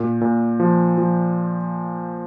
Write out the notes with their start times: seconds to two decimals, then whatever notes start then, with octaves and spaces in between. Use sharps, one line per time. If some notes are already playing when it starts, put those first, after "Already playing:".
Already playing: A#2
0.21 A#2
0.60 F3
0.98 F3